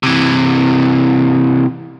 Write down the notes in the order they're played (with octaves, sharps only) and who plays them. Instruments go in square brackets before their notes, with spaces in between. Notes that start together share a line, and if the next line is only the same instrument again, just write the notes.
[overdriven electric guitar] C3 E3